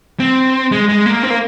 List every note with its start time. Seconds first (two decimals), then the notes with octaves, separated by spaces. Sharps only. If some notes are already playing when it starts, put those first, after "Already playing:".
0.20 C4
0.71 G#3
0.88 G#3
1.06 A#3
1.23 C4
1.31 A#3